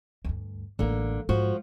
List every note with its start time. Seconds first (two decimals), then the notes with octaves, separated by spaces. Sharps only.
0.24 D2 G2
0.79 A1 D3 E3 G#3 A#3
1.29 G#2 F3 G#3 F#4